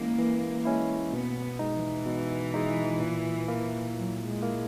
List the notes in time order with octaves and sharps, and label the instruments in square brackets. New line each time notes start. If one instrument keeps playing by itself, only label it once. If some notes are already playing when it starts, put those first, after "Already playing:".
Already playing: [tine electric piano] E3 G#3 C#4 E4 [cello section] A#3
[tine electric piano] E3
G#3 C#4 E4
[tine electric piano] B2 [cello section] B3
[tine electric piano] G#3 D#4
[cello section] E3
[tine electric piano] B2
G#3 D#4
A#2
A#3 E4
[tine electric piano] A#2 [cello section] F#3
[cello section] G#3
[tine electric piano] A#3 E4